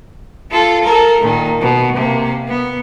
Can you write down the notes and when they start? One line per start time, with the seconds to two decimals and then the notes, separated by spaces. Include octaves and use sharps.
0.51 F4 A4
0.84 A4 A#4
1.21 A#2 D#3
1.61 B2
1.96 C3 A#3
2.49 B3